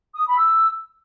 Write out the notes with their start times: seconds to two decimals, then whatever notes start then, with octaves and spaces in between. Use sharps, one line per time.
0.15 D#6
0.26 B5
0.37 E6